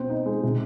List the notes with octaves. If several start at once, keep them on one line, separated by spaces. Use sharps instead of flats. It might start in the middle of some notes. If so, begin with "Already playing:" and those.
Already playing: B2 C4
D#4
G#3
C3